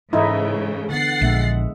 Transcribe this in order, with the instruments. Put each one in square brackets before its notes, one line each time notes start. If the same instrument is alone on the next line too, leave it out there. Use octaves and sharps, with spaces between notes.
[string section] G#2 C#3 [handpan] E3 A4 [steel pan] D#4 E4
[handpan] D3 B3 [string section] F#5 A6 C7
[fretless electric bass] A#1 [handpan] G#3 E5